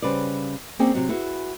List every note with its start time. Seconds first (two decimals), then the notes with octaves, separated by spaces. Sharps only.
0.02 C#3 G3 B4 C5 D5
0.79 A#3 C4 C#4 G#4 D5 G5
0.95 C3 F#3
1.09 E4 F#4 G#4 B4